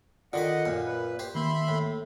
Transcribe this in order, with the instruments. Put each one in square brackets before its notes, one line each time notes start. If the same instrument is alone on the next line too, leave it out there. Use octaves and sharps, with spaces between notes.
[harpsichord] D3 D#3 B5 [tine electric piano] F4 D5 [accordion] D#5 F#5
[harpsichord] F#2 A#2
[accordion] B4
[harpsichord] G4 C5
[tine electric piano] D#3 A#3 [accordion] E5 B5 C6
[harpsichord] A2